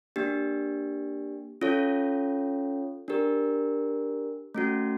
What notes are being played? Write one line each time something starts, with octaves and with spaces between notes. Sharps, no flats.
A#3 D4 G4
C#4 F4 A4 C#5
D4 G4 A#4
A3 C#4 F#4